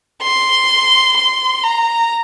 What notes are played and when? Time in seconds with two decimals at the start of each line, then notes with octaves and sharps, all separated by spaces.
0.23 C6
1.17 C6
1.64 A#5